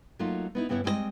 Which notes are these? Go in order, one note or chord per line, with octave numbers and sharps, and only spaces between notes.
F#3 A3 A#3 D#4 F4
B3 D#4 E4
G2 C#3 B3 E4 A#4 C#5
G3 G#3 C4 E4 D#5